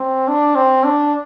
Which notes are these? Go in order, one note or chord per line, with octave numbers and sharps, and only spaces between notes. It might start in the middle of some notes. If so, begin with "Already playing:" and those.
Already playing: C4
D4
C4
D4